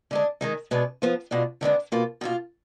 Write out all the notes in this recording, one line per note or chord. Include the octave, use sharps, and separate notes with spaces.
D3 G#3 D4
D#3 G#3 D#4
B2 G#3 B3 D4
F3 B3 F4
B2 G#3 D4 F4
D3 G#3 B3 D4
B2 A#3 F4
B2 A#3 F4